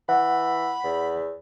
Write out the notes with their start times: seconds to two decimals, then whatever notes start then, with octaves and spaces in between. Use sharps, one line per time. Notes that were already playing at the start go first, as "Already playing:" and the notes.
0.09 E3 F#5 B5
0.84 E2